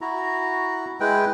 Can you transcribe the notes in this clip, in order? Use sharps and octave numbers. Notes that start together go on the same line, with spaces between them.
E4 F#4 A#5
G#3 E4 B4 G5